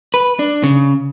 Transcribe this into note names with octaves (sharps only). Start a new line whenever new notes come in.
B4
D4
C#3